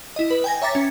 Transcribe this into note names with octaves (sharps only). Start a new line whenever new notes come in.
E4 D#5
B4
G5 G#5 A#6
C#5 E5 A#5 D6 A6 B6
C#4